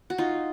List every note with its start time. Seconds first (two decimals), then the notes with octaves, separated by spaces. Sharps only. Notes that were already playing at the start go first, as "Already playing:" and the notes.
0.10 F#4
0.18 D#4 F4